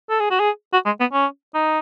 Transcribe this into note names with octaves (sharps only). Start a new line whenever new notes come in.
A4
G#4
F#4
G#4
F#4
G#3
B3
C#4
D#4